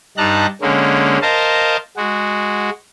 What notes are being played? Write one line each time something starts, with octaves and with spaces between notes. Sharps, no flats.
G2 G3 D#4 A5 A#5 F#6
D3 G#3 A#3 C#4
A#4 C5 D#5 F5 A5
G#3 F#4